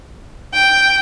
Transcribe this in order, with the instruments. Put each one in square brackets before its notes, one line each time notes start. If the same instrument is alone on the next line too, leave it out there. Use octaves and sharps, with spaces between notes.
[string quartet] G5